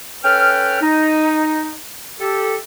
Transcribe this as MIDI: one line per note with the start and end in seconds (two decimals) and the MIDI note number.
0.24 0.79 61
0.24 0.79 69
0.24 0.79 71
0.24 0.79 79
0.24 0.79 89
0.81 1.75 63
2.20 2.56 67
2.20 2.56 69